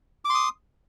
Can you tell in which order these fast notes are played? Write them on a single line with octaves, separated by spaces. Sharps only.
D6 C6 D#6